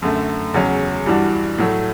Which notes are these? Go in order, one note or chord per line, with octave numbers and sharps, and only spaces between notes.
F#2 D3 A3
E2 C#3 F#3 C#4
G2 E3 G3 D4 F#4
A2 F#3 A3